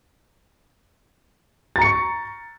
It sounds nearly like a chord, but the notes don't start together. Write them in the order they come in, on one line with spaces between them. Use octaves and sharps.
A6 A#5 C#7 C#6